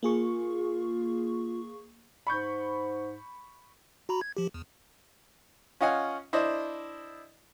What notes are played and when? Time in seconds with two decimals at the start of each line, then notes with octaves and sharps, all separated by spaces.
0.03 A#3 F4 G#4 C#6
2.27 G#2 B5 C#6 G6
4.09 F#4 A#5 B5
4.21 G#6
4.37 F3 G4
4.54 E2
5.81 C#4 F4 D#5 F#5 G#5
6.33 D4 E4 C5 D5 D#5